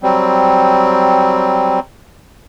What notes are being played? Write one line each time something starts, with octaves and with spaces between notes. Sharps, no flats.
F#3 G3 C4